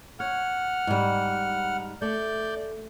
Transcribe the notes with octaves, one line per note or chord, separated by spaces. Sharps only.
C#5 F#5 F6
G#2 G3
A3 D5 G6